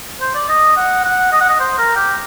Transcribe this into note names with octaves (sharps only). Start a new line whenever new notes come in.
C5
D5
D#5
F#5
F#5
D#5
F#5
D#5
C5
A#4
G4